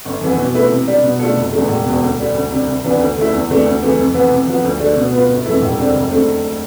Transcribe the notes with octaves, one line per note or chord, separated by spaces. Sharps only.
G1
F2 E3 B3
B2
A3 E4 B4
C3
G3 D4
B2
A3 D4 F4 A4
F1
E2 D3 A3
E1
E2 B2
D2
D3 G3 D4
D2
C3 G3 D4
C2
C3 E3 B3 D4
D2
D3 A3 E4
E2
C3 E3 A3 D4
D2
C3 E3 A3
F2
C3 E3 B3
C3
F3 B3
D2
D3 A3 D4
B2
B3 F4 B4
G1
F2 E3 A3 E4
E1
D2 D3 G3 C4
F1
D3 A3 C4